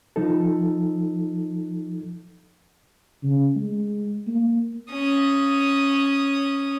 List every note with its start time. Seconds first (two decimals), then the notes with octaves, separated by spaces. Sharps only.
0.16 F3 D#4 A4
3.23 C#3
3.56 G#3
4.27 A#3
4.91 C#4 D#6